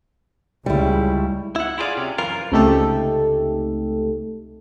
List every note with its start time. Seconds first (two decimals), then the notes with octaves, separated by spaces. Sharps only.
0.66 C#2 C#3 G3 E4
1.56 E4 F#5
1.78 E4 F4 G#4 D5 F5
1.97 C3 C#4
2.18 F#2 E3 F4 A#4
2.52 C#2 C3 A3 D#4 G4 A4